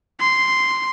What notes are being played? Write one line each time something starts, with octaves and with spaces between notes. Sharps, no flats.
C6